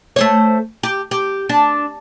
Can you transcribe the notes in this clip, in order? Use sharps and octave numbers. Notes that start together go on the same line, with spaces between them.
A3 C5 C#5
G4
G4
D4